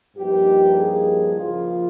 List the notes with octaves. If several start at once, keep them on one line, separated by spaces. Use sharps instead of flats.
G2 F3 A#3 D#4 G4
G#4
C#3 F3 A#3 F4